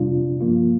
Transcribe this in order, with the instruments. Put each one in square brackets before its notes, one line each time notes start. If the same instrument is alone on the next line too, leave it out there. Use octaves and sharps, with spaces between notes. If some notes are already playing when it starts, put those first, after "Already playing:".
Already playing: [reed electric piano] F2 C3 G3 D4 F4
G2 F3 A#3 F4